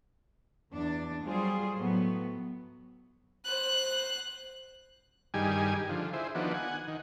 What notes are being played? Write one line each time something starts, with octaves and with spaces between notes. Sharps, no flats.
E2 D4
F#3 G3 F4 G#4 C5
A2 F#3 B3
C5 F#6
G2 D#3 G3 G#4 G#5
D3 F3
E4 G#4 C5
D#3 F3 B3 D4 F#4
F#5 G#5
D#3